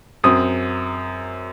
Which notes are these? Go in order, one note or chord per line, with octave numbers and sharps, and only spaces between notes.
F#2 F#3 C4 D#6